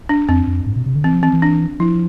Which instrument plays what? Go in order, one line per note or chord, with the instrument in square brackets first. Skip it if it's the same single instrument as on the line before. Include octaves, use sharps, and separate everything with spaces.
[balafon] D4
[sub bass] F2 [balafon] C4
[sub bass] F2
G#2
B2
C3
D3
[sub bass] E3 [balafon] C4
[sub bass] F3
[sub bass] E3 [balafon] C4
[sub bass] E3
[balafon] D4
[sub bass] F3 [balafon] E4